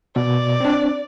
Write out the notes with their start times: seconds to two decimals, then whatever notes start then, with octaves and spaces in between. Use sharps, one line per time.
0.16 B2 D5
0.61 C4 D4